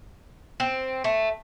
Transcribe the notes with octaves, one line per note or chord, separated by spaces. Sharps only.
C4
A3